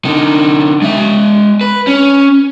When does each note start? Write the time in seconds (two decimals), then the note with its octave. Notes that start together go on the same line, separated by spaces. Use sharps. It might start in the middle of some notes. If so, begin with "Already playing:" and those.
0.05 D3 D#4
0.82 G#3 E5
1.61 B4
1.87 C#4